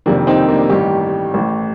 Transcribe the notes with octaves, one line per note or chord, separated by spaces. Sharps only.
F1 F2 C3 D#3 A#3 D4
C4 D#4
A#3 D4
A1 G2 D#3 D#4 G4
A1 A2